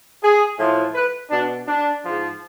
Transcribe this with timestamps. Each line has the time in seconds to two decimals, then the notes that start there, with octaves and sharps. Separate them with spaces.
0.22 G#4
0.58 A2 F3
0.94 B4
1.30 B2 D4
1.67 D4
2.03 G#2 F3